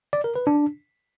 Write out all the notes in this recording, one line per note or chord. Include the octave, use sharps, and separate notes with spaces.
D5
A#4
B4
D4